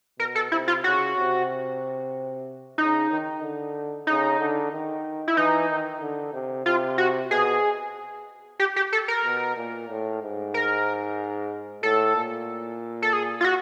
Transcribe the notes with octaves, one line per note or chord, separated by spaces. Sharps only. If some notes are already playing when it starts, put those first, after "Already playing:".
B2 A#4
A4
C3 E4
F4
C#3 F#4
C3
C#3 D#4
D#3
D3
C#3 D#4
D3
D#3
E4
E3 D#4
D#3
D3
C3
C3 F4
F#4
B2 G#4
G4
G4
A4
A#4
B2
A#2
A2
G#2
A#4
A2 A4
A#2
A4
G#4
F4
F#4